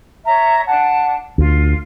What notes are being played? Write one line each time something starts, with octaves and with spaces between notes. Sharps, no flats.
C#5 E5 A#5
D4 F#5 A5
D2 F4